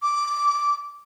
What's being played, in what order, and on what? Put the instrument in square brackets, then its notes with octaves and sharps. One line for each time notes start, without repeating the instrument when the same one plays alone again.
[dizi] D6